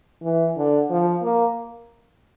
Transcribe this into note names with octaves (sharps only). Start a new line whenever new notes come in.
E3
D3
F3
A#3